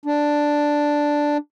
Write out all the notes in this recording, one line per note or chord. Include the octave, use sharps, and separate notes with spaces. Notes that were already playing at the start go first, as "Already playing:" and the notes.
D4